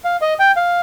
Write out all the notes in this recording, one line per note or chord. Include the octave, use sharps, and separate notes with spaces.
F5
D#5
G5
F5